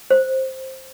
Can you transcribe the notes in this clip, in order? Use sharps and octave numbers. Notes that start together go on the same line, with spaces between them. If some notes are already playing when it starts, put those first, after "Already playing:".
C5